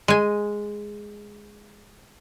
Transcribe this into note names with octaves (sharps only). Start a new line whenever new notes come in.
G#3 G#5